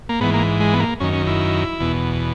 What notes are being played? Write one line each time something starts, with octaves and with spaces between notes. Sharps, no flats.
A#3
G#2 E3 B3
A#3
G#3
B3
A#3
F#2 D#3 C#4
C#4
E4
E2 B2